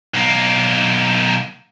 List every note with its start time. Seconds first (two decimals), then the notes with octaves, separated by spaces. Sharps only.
0.14 B1 A#3